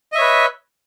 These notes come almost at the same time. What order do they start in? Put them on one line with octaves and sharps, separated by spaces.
D#5 E5 C#5 B4